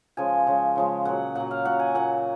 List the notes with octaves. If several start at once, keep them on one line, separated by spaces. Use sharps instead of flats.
C#3 F3 G#3 G#5
C#3 F3 G#3
C#3 F3 G#3
A#2 F#3 F#5
A#2 F#3 F#5
F5
A#2 F#3 F#5
G#5
A#2 F#3 F#5